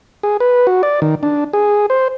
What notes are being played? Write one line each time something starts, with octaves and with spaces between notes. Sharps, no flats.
G#4
B4
F#4
D5
D#3
D4
G#4
C5